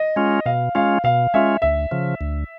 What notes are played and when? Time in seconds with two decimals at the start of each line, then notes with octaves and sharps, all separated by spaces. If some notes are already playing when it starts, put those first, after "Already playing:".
Already playing: D#5
0.16 G#3 C#4 F4
0.46 B2 F5
0.75 G#3 C#4 F4 F5
1.04 B2 F5
1.34 G#3 C#4 F4 E5
1.62 D2 E5
1.91 C#3 F3
2.21 D2